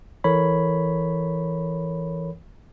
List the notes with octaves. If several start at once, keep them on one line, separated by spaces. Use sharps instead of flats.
E3 A4 A#4 C#5 B5